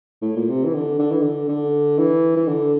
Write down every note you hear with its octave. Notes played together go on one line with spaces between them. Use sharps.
A2
A#2
C3
E3
D3
D3
E3
D3
D3
E3
E3
D3